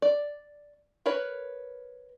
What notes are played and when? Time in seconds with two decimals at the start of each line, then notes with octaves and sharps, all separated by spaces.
0.02 D5
1.06 A#4 B4 C#5 B5